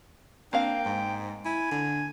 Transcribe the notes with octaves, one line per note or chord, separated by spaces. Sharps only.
A#3 C4 D4 F5 G5
G#2
E4 G#5
D3